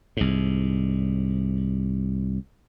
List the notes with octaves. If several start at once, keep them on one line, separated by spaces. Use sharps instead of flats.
C2 G#2